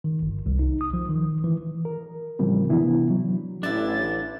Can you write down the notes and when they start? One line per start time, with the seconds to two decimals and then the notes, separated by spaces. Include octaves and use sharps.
0.04 D#3
0.22 G1
0.46 C2
0.59 D#4
0.81 D#6
0.93 F3
1.10 D#3
1.44 E3
1.85 A#4
2.39 A2 C#3 E3 F3 G3 C4
2.69 C3 E3 B3 D4 E4
3.10 F#3
3.63 A1 D4 E4 A6